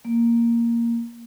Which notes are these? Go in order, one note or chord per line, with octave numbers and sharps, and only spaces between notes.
A#3